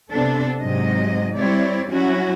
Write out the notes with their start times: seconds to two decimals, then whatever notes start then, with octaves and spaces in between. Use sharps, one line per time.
0.10 C3 B3 D4 A4
0.61 G#2 C3 F#3 D#5
1.37 G3 C4 E4 C#5 D5
1.91 F#3 C#4 E4 F#4